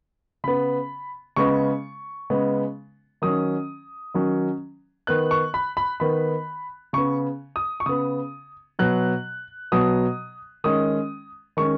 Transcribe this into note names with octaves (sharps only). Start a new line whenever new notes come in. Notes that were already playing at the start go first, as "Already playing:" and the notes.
C#3 B3 B5
C#3 G#3 B3 C#6
C#3 G#3 B3
D#3 F#3 C#4 D#6
D#3 F#3 C#4
D#3 B3 F#6
C#6
B5
B5
D#3 B3 B5
C#3 B3 C#6
D#6
C#6
C#3 B3 D#6
B2 F#3 B3 F#6
B2 F#3 B3 D#6
D#3 G#3 C#4 D#6
D#3 G#3 C#4 C#6